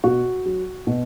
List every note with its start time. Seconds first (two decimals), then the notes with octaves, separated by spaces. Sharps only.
0.04 B2 F#4
0.46 F#3
0.87 B2